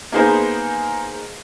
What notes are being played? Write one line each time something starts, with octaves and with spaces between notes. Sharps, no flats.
A#3 B3 D#4 G#4 A#4 C5